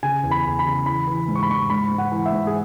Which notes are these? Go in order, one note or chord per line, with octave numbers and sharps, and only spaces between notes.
C#3 G#5
E2
B5
E2
B5
C#3
E3 B5
E3
G#2
C#6
B5
G#2 C#6
G#2 B5
G#2
F#5
E3
E5
G#2
G#4